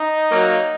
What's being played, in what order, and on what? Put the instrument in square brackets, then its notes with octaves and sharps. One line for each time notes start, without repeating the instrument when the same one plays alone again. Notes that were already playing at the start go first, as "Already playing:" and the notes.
Already playing: [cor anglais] D#4
[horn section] F#3 A#3